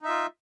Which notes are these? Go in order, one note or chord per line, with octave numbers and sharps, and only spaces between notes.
D#4 F4 E5